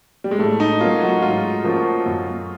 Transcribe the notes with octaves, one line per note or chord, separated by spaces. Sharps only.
G3
G#3
A2 A3
D#4
F#3 A#3 C#4 F4
F#4
G#2 F4
F3 A#3 C#4 F#4
F#2